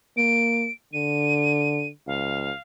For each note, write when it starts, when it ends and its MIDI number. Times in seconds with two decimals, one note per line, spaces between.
0.17 0.68 58
0.17 0.72 98
0.93 1.90 50
0.93 1.88 99
2.07 2.51 37
2.07 2.61 77